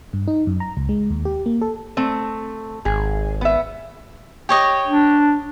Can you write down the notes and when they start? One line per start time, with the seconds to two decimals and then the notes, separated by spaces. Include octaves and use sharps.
0.13 G2
0.28 D#4
0.47 F#2
0.60 A#5
0.77 C#2
0.89 G#3
1.10 D#2
1.25 G4
1.46 A#3
1.61 A4
1.97 A3 C4
2.85 G#1 G#4
3.41 B3 E5
4.49 G4 C#5 D#5
4.87 D4